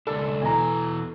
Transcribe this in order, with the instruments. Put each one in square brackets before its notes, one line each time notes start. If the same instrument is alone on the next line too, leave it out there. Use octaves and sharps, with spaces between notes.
[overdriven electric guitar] C#2 D4 [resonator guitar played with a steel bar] A4
[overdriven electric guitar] B2 E3 [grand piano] G#5 A#5